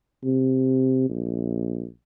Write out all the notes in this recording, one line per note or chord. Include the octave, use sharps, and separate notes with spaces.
C3
A#1